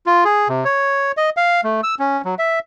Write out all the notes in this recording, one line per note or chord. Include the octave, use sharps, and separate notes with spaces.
F4
G#4
C3
C#5
D#5
F5
A3
E6
C#4
F#3
E5